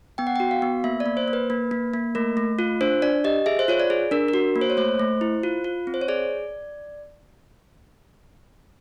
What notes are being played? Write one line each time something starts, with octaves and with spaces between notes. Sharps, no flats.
B3 G5
F#5
F#4 G5
F5
B3
A#3 E5
D5
A#3
C5
A#3
B4
A#3
A#3
A#3
A3 A#4
A3
F4
D4 C5
D4 D5
G4 D#5
G#4 E5
C5
F4 C#5
D5
G#4
D4 A#4
A#4
F#4
A#3
C5
C#5
A3 C5
A3
E4
F4
F4
C4
C5
C#5
G#4 D5